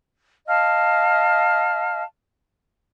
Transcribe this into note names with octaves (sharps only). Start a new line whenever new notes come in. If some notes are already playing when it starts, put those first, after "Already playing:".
D#5 F5 A5 F6